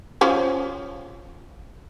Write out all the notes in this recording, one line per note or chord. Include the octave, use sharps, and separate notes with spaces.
F3 C#4 C5